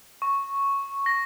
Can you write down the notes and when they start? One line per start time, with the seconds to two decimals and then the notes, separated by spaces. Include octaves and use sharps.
0.22 C#6
1.06 A#6